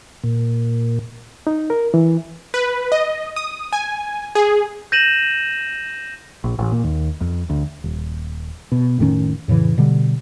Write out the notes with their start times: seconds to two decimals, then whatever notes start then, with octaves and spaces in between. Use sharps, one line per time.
0.24 A#2
1.47 D#4
1.70 A#4
1.94 E3
2.54 B4
2.92 D#5
3.36 D#6
3.73 G#5
4.35 G#4
4.92 G6 A#6 D#7 E7 F#7
6.44 A#1
6.59 A1
6.72 A#2
6.84 D#2
7.21 F2
7.50 D2
7.84 D#1
8.72 B2
8.99 F1 A2 D#3 C#4
9.48 F2 A2 C#3 E3
9.78 B2 D3 G3